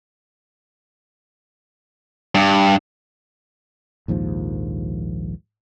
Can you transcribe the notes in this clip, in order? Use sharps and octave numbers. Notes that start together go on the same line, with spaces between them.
G2
A#1 D#2 G#2 F3